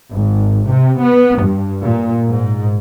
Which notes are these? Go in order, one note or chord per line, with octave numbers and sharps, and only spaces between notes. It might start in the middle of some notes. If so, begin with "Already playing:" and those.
G#1
C3
B3
G2
A#2
G#2